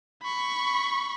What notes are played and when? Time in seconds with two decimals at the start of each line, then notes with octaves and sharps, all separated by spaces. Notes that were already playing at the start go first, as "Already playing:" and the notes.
0.23 B5 C#6